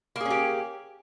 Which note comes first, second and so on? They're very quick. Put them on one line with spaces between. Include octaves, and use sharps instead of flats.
A#3 G#4 C#4 G4